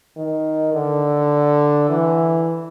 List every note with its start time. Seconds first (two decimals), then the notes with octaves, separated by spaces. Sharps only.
0.17 D#3
0.74 D3
1.89 E3